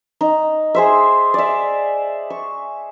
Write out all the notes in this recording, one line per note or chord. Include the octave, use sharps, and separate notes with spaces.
D#4
G#4 C5 E5
D5 E5
C#6